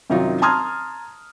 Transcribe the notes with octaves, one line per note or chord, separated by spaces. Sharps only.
F#2 C3 D#3 F#3 D#4 F4
A5 A#5 C6 D#6 F6 G#6